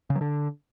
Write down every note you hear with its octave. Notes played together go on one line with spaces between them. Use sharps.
C#3
F#3
D3